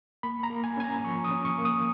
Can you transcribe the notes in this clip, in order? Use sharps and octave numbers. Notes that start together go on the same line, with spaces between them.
A#3 B5
A#5
A#3
G#5
C#4 G#5
A#5
F3 C#6
D#6
C#4
C#6
A#3
D#6